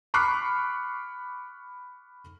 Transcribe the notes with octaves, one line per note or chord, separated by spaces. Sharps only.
B5 C#6 D6 F6 F#6 C7